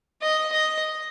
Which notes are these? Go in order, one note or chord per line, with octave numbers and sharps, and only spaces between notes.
D#5
D#5